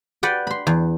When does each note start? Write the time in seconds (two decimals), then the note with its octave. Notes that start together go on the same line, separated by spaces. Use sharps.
0.23 B4 D5 F#5 G5
0.47 B5 C6
0.67 E2